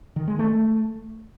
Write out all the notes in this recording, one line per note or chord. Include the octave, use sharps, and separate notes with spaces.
D#3
G#3
A3